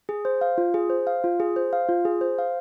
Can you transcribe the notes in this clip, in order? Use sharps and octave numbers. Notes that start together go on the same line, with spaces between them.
G#4
C5
F5
F4
G#4
C5
F5
F4
G#4
C5
F5
F4
G#4
C5
F5